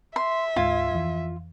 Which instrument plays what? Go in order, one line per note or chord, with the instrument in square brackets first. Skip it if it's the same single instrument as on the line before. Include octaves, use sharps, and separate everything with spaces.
[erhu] E5 [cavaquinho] C6
[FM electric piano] D2 G#2 G#6 [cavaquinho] F4
[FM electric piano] F2 E3